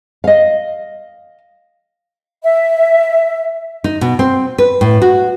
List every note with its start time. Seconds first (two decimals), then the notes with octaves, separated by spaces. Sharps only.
0.24 D#5 F5
2.43 E5
3.84 D#4
4.01 B2
4.19 C4
4.58 B4
4.81 A2
5.02 F#4